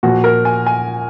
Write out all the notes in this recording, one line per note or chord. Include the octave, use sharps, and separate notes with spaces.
A#2 F3 F#4
A#4
G#5
G#5